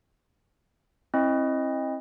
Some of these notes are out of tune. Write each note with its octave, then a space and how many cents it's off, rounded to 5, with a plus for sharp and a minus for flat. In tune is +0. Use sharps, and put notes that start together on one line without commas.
C4 +35 E4 +0 D#5 +0